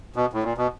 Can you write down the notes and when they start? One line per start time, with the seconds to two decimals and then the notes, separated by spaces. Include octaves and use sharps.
0.16 B2
0.33 A2
0.43 A#2
0.58 B2